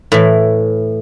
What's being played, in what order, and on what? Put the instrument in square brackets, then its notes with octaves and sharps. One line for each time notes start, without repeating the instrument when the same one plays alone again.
[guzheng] A2 E3